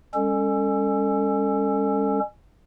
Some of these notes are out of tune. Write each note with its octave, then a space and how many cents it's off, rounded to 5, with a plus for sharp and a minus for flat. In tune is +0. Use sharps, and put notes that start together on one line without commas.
G#3 -45 C#4 +0 A4 +20